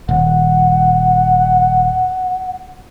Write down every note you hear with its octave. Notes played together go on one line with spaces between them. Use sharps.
D#1 F#5